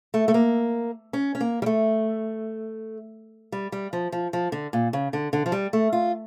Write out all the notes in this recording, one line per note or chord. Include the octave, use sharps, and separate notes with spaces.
A3
A3
A#3
C#4
C#4
A#3
G3
A3
G3
G3
F3
F3
F3
D3
A#2
C#3
D3
D3
F3
G3
A3
F4